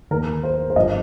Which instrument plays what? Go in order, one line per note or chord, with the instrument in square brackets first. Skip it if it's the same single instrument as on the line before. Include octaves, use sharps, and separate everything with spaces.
[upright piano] D#2 D#3 A#4
C5
C5
G1 G2 F3 D#5